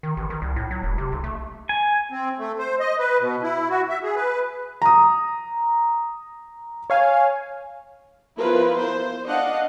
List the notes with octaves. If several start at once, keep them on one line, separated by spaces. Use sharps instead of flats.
D#3
A1
D#3
C2
A2
F#3
E1
C3
B1
A3
G#5
C4
A3
C5
D#5
B4
B2
E4
F#4
E5
G#4
B4
A#5 D#6
C#5 F5 G#5
F3 B3 E4 F4 A#4 B4
C5
D4 D#5 F5 F#5